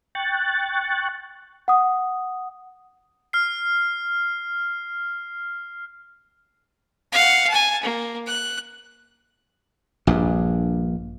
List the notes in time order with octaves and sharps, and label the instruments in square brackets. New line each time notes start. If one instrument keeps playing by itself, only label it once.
[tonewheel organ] G5 C#6 F#6 A6
[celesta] F#5 D#6
[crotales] F6 C7
[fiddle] F5 F#5
G#5 A5
A#3
F#6
[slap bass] A#1 G2